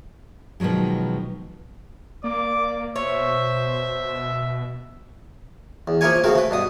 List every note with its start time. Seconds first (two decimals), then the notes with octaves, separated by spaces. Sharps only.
0.60 B2 D#3 F3 F#3 G#3
2.24 A#3 D5 D6
2.96 B2 C5 C#5 E5
5.88 E2
6.01 F3 A#3 E4 A#4 C#5 G#5
6.24 C#3 A3 C4 F#4 A#4
6.35 A3 B4
6.51 G2 B2 D#6